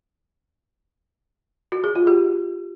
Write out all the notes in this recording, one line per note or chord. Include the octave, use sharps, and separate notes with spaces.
F#4
G#4
F4
G4